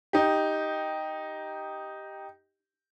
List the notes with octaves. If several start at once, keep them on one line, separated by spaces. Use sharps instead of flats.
D#4 G4